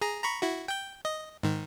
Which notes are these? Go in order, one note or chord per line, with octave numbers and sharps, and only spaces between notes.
G#4 A#5
A#5 B5 C#6
E4 F#4
G5 G6
D#5
G#2 D#3